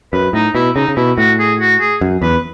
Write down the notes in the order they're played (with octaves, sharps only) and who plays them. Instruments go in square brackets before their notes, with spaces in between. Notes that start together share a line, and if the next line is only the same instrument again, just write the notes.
[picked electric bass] F#2 [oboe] B4
[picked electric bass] A2 [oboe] D#4
[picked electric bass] B2 [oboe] E4
[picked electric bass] C#3 [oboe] D#4
[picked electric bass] C#3
[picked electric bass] B2 [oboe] E4
[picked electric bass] A2 [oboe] F#4
[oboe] G#4
F#4
G#4
[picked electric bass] F#2
[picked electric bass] E2 [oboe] B4